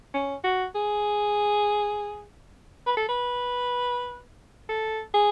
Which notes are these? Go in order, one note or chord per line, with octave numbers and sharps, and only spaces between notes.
C#4
F#4
G#4
B4
A4
B4
A4
G#4